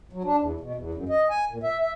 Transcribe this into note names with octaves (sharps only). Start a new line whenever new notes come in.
F#3
D4
E2
B2
E2
F#2
D#5
G#5
A#2
E5
E5